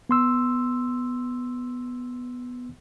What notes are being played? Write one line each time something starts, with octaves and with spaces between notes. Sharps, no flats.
B3 C6 E6